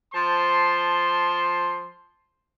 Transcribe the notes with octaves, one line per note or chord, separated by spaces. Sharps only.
F3 C5 A5 C6